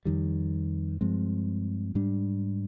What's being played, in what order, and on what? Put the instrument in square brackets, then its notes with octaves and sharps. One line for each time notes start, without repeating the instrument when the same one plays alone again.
[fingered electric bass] F2 D#3 G3
G2 F3 G#3 C4
G#2 G3 D4